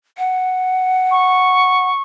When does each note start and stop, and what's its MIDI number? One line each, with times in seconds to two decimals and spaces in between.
0.18 1.89 78
1.11 2.02 85